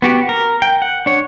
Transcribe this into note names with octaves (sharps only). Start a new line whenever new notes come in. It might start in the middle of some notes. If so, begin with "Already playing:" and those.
B3 F#4 G4
A#4
G5
F#5
D4 C#5